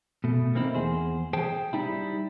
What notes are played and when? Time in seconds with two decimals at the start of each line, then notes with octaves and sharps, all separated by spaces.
0.24 B2 A3
0.55 A#3 C4 D#4 E4
0.75 E2 G#4 C5
1.33 G#4 C5 G5 A5
1.73 G3 D#4 E4